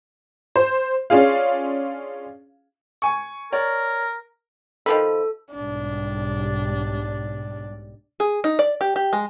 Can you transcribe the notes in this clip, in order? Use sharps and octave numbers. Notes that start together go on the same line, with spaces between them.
C5
C#4 D4 F4 G#4 F5
G#5 C#6
A#4 C#5 D5
D#3 F3 A4 B5
B1 G#2 G3 D4
G#4
D#4
D5
G4
G4
G#3